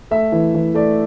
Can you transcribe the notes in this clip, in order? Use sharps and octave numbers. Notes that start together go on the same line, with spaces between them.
A3 E5
E3
E3
A3 D5